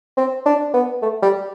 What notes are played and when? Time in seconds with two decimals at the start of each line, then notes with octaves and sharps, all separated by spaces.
0.17 C4
0.46 D4
0.74 B3
1.02 A3
1.22 G3